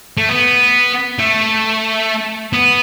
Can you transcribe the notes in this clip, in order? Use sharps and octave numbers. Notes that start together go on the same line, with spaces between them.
A3
B3
A3
B3